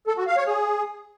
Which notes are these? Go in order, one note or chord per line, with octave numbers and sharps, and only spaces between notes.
A4
F#4
F5
C#5
G#4